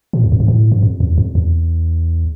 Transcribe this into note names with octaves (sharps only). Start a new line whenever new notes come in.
A#2
E2
F2
G2
A2
G2
F2
E2
F2
E2